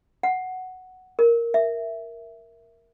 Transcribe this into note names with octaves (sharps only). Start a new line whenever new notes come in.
F#5
A#4
E5